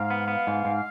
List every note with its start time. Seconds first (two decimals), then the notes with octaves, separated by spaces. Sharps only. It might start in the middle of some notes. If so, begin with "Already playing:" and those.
Already playing: G#2 F5
0.10 B3
0.28 B3
0.47 G#2
0.65 G#2